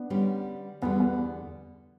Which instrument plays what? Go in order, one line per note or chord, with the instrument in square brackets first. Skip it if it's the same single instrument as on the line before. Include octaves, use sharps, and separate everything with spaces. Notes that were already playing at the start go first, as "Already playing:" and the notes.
Already playing: [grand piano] B3 D4
[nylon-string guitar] D3 G3 C#4 G4 B4
[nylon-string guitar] E2 D3 G3 [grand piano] B3
[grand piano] B3